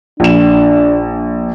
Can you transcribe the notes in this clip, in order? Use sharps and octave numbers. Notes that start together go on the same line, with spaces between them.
A#1 D4 E7